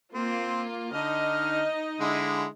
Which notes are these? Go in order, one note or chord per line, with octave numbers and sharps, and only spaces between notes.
A#3 C4 F4
D3 D#4 D#5 F6
D3 G#3 E4